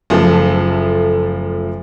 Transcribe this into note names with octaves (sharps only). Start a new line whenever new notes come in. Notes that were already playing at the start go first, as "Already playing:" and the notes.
F#1 F3 A3 A4